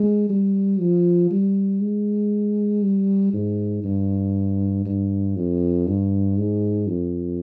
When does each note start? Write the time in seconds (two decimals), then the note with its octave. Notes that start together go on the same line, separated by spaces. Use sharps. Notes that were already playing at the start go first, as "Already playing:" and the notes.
Already playing: G#3
0.29 G3
0.80 F3
1.31 G3
1.81 G#3
2.83 G3
3.33 G#2
3.84 G2
4.85 G2
5.36 F2
5.87 G2
6.37 G#2
6.87 F2